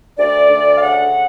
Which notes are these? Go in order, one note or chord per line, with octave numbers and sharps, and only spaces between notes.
D2 D5
D2
F5
C#3 F#5